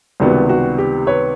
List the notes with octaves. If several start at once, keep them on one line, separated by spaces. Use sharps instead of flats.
C#2 C3 D#3 G3 B3 F#4
F#4
G4
B4 C#5